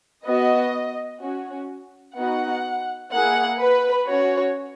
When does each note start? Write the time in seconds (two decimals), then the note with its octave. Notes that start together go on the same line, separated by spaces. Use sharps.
0.25 B3 F#4 D#5
1.20 C#4 F#4
2.16 B3 D#4 F#4 F#5
3.10 A#3 E4 G#4 F#5
3.59 B4
4.06 C#4 F#4 C#5